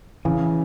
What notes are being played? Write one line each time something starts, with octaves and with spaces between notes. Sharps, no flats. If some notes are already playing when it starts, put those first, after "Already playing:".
C#3 E3